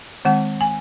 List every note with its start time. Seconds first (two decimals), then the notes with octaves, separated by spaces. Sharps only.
0.25 D#3 G#3 C4 F#5
0.61 G#5